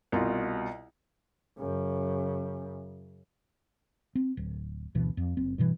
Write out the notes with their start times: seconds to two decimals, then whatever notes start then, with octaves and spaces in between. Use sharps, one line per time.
0.12 C2 B2 F4
1.58 F#2 C#3
4.15 C4
4.37 D1
4.95 F#1 D2 B2 E3
5.17 F2
5.37 F#1 C4
5.58 G2 B2 E3